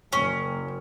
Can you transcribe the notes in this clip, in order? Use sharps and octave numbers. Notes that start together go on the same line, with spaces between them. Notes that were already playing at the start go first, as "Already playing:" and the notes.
F#1 C#4